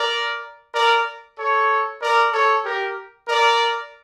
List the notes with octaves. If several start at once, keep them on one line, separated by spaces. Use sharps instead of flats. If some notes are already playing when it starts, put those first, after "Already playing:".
Already playing: A#4 D5
A#4 D5
A4 C#5
A#4 D5
A4 C#5
G4 A#4
A#4 D5